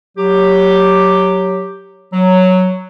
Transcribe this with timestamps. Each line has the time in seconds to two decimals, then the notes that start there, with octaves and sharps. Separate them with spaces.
0.17 F#3 G4
2.13 F#3